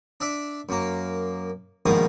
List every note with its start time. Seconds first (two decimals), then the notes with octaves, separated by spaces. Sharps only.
0.20 D4 D5 E5
0.69 F#2 A#3
1.86 A#1 G#2 B2 D#3 F3 D#6